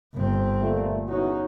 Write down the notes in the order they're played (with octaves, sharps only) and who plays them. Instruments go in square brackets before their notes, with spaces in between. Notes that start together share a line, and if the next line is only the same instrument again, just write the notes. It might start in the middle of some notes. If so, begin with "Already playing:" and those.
[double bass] G1 C4
[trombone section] A#2 A3
[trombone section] E2 C#4 F#4 [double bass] D#4